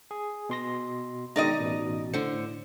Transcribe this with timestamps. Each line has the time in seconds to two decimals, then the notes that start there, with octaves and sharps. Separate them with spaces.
0.11 G#4
0.49 B2 C6 A#6
1.36 B2 D#3 G#3 D#4 D5 D#5
1.59 A1 B2
2.14 A2 D3 C5 C#7